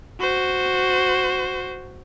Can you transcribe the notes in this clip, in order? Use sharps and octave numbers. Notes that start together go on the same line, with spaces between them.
F#4 C5